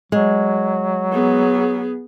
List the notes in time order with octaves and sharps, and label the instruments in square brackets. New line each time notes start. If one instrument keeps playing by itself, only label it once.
[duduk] F#3 [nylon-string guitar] G#3
[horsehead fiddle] B3 G#4